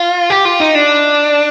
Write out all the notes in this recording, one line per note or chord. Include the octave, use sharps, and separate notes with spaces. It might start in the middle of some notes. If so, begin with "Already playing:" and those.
Already playing: F4
G4
F4
D#4
D4